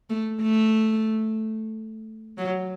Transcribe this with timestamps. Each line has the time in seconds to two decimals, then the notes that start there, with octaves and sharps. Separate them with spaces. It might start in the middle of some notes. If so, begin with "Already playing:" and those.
0.10 A3
0.41 A3
2.38 F#3